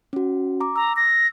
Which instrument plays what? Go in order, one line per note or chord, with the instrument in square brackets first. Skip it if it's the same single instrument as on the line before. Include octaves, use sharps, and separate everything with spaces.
[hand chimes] C#4 F#4
A#5 D6
[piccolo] A#5 [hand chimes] E6
[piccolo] A#6